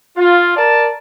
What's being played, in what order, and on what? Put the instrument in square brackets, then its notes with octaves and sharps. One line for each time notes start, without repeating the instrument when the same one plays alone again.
[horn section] F4
A#4 D5 A5